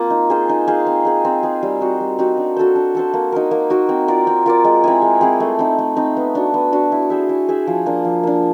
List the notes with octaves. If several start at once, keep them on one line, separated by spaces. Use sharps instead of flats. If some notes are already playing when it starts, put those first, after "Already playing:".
Already playing: A#3 C4 F4
D#4
G#4 C5 F5
D#4
G#4 C5 F5
C4
D#4 G#4 C5
C4
D#4 G#4 C5
G3
C4 D#4 F#4
G3
C4 D#4 F#4
D4
F#4 A4 C5
D4
F#4 A4 C5
A#3
D#4 F#4 A#4
A#3
D#4 F#4 A#4
C4
F4 A#4 D5
C4
F4 A#4 D5
G#3
C4 E4 G#4
G#3
C4 E4 G#4
A3
C4 D#4
A3
C4 D#4
B3
D4 F#4
B3
D4 F#4
E4
G#4 C5 E5
E4
G#4 C5 E5
F3
A#3 D4
F3
A#3 D4